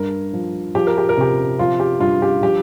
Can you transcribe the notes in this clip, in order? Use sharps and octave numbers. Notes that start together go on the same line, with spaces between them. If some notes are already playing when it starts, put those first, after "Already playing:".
Already playing: G2 A#4
F3
F3 G4
A#4
G4
A#4
C3 G4
F3 F4
G4
G2 F4
G4
F3 G4